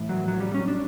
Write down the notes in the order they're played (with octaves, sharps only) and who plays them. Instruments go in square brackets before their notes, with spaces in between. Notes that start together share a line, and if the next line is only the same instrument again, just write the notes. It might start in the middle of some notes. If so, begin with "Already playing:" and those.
Already playing: [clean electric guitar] A2 E3
F#3
F#3
G3
C#4
D4